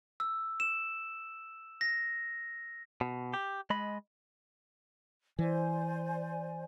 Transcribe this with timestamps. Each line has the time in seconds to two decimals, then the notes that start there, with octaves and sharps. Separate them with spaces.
0.20 E6
0.60 E7
1.81 A#6
3.01 B2
3.34 G4
3.70 G#3 D#5 B5
5.39 E3 C5 D5 G#5